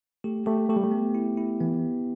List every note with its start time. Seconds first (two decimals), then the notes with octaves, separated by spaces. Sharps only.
0.24 A3 G4
0.46 A3 G4
0.69 A3 G4
0.76 G3
0.84 A3
0.92 B3
1.15 E4
1.37 E4
1.60 E3 B3